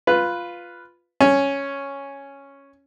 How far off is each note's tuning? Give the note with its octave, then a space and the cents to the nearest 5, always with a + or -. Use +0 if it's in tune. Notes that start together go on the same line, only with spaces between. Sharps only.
F4 +0 B4 +0
C#4 +0 C#5 +0